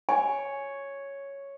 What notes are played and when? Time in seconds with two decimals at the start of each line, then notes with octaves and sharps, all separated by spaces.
0.09 C#5 G#5